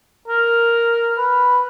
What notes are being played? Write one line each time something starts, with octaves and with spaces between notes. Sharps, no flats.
A#4
B4